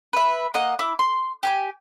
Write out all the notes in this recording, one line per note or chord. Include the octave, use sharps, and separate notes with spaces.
B4 E5
A#3 D#5 F#5
E4 D6
C6
G4 G#5 D6